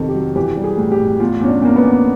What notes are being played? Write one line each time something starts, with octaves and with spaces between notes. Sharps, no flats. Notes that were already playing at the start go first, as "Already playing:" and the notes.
Already playing: F2 C3 D#3 A4
G4
F#3
E3 G4
G3
G#4
A2
G4
A2
E2 F4
E2 C#4
D4
E2 A#3
B3
E2